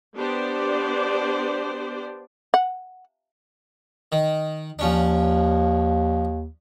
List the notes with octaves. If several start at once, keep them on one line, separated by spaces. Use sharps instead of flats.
B3 D4 G4 C5 D5
F#5
D#3
D#2 F3 C#4 D4